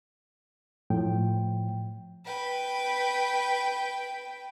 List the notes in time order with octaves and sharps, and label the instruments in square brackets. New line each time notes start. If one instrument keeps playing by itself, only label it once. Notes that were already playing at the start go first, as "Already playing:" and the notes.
[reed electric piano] A2 F3 G5
[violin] B4 G5